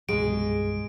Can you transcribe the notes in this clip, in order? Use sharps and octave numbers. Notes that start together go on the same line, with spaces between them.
C2 G2 B2 G#3 G#4 D7